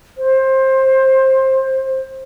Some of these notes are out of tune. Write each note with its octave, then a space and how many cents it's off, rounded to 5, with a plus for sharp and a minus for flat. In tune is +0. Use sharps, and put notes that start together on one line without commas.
C5 +20